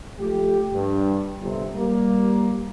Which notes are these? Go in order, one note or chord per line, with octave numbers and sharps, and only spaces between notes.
F3 A3 G4
G2
G1 C3
G3 A#3